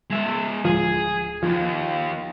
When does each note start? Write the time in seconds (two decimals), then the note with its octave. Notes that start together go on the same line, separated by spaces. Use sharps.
0.10 G#3 E5
0.65 D1 F3 G#4
1.43 D#2 F3